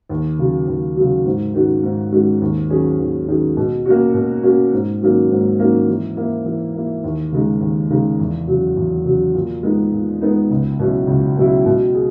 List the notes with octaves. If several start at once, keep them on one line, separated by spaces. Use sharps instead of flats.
D#2
C#3 F#3
D#2
C#3 F#3
G#2
D#3 G#3 C#4 F#4
G#2
D#3 G#3 C#4 F#4
D#2
D#3 F#3 C#4 G#4
D#2
D#3 F#3 C#4 G#4
B2
A#3 C#4 F#4
B2
A#3 C#4 F#4
G#2
D#3 F#3 A#3 C#4
G#2
D#3 F#3 A#3 C#4
E3
A#3 E4
E3
A#3 E4
D#2
C#3 G#3 D#4
D#2
C#3 G#3 D#4
E2
C#3 F#3
E2
C#3 F#3
A#2
G#3 B3 D#4
A#2
G#3 B3 D#4
C#2
B2 F#3 C#4 E4
C#2
B2 F#3 C#4 E4
B2
G#4